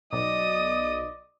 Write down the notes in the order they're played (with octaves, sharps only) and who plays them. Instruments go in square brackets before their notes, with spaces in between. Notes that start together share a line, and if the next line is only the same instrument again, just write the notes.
[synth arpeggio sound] B1 [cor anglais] D5 [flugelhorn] D#5 [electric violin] D#6